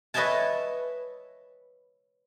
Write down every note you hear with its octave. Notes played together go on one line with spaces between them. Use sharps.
B4 C#5 D#5 E5 G#5 A5